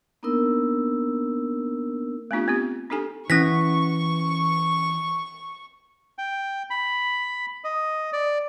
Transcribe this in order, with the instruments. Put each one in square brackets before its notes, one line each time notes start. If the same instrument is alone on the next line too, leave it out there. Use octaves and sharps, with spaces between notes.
[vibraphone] A#3 B3 D4 D#4 A#4 E6
[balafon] A3 B3 C4 D4 F4 G4
B3 C4 G4
D4 D#4 G4 A4 G#5
[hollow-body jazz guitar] E3 [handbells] C#4 A#6 B6 [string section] C#6
[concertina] G5
B5
D#5
D5